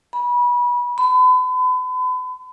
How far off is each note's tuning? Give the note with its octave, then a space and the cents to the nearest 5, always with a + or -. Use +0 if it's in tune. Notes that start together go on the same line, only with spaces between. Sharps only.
B5 -25
B5 +40